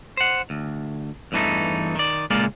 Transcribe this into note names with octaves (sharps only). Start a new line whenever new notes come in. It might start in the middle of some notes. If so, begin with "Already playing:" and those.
C5 F#5
D2
E2 G2 E3 A3 D#4
D#3 D5
C#2 A#2 G#3 A#3 F4 D5